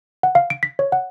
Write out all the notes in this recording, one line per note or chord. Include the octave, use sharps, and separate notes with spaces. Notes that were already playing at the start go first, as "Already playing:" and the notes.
F#5
F5
D7
B6
C#5
F#5